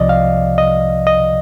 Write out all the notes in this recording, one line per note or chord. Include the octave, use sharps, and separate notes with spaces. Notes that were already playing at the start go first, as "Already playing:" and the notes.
Already playing: C2 C3 F3 D5 D#5
F5
D#5
D#5